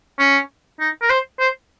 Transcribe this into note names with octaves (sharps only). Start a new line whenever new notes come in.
C#4
D#4
A#4
C5
C5